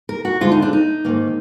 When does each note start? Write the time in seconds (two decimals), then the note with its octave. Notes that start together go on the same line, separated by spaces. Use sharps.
0.09 A#4
0.25 F#4
0.41 D2 D3 G#3 F4
0.52 D#4
0.62 D4
0.73 D#4
1.05 G#2 D#3 A#3